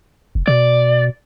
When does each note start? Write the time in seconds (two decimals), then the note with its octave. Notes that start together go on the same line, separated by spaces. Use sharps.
0.35 F1
0.47 B2 D5